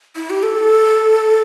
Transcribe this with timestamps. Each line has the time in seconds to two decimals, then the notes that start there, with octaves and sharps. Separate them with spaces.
0.16 E4
0.30 G4
0.43 A4